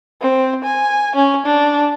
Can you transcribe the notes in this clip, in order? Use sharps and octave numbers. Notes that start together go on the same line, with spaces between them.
C4
G#5
C#4
D4